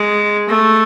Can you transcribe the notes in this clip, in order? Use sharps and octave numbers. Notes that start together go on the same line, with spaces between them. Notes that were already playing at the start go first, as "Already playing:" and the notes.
Already playing: G#3
A3